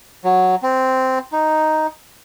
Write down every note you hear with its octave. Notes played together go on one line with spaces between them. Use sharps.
F#3
C4
D#4